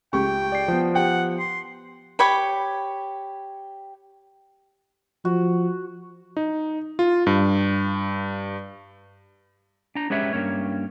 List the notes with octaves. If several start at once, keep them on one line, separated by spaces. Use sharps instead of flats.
C#2 G4 G5 C#6
D5 C7
F3 B3
G4 F#5 G5
C6
G4 C#5 B5
F3 F#4
D#4
F4
G2
D4 A#5
G#3 C#4 G4 B4 C#5 E5
G2 D3 A#3 C#4 C#5